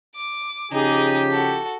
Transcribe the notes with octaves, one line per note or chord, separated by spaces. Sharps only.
D6
C#3 F3 D#4 G4 G#4
F#4 A4